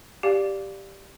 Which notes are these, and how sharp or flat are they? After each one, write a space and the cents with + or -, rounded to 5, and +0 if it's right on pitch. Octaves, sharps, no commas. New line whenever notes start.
G4 +0 D5 +0 F5 +0